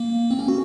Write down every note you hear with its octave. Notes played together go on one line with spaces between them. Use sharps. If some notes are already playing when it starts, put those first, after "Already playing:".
Already playing: A#3
C4
C#4
F#4